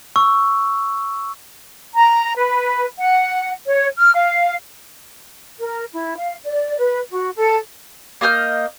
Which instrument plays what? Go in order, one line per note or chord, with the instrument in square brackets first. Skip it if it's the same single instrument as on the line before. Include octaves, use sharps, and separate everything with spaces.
[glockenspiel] C#6 E6
[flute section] A#5
B4
F#5
C#5
F6
F5
A#4
E4
F5
D5
B4
F#4
A4
[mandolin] A#3 D#5 F6 G6